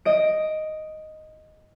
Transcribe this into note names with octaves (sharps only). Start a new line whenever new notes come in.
D#5 D7